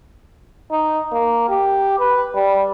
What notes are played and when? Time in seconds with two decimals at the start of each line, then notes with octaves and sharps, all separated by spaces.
0.71 D#4
1.13 A#3
1.49 G4
2.00 B4
2.35 G3